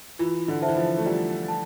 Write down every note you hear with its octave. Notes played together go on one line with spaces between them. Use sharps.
E3 F4
D3
C5 E5 A5
E3
F3
A3
G3 F4
A5